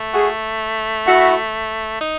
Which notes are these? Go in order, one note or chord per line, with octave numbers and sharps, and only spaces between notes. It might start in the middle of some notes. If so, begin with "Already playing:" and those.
Already playing: A3
F#4 G#4
E4 F#4
D#4